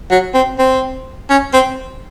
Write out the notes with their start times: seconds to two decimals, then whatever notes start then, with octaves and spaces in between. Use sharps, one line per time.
0.11 F#3
0.34 C4
0.59 C4
1.30 C#4
1.53 C4